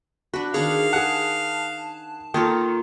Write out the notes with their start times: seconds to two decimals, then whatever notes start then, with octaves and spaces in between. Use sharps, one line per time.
0.34 D4 F#4 B4
0.54 D#3 D4 G#4 C#5 F5
0.93 G#4 F#5 A5
2.34 D#3 A#3 F4 A4 C#5